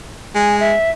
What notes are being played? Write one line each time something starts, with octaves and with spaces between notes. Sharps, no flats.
G#3 G#5
E5